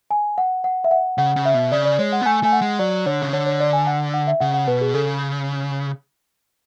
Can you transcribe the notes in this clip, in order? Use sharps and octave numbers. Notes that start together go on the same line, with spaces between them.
G#5
F#5
F#5
E5
F#5
C#3 F#5
C#3
E5
B2
C#3 D5
D5
G#3 C#5
F#5
B3
A3 G#5
A3 G#5
F#5
G#3
F#3 D5
D3 C#5
C#3
D3 C#5
C#5
D5
G#5
F#5
F#5
E5
C#3 F#5
F#5
B2 B4
G#4
C#3 A4